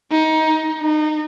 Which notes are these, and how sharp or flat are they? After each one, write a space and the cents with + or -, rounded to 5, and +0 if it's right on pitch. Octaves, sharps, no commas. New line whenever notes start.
D#4 +20
D#4 -25